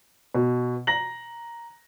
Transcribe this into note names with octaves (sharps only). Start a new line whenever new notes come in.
B2
A#5 A#6 F#7